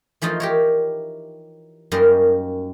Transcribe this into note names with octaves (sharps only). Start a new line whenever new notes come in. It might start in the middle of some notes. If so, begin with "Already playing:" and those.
E3 F3 A3 D#4 F4
G4 A#4 C#5
F#2 G3 A#3 C#4 D#4 A#4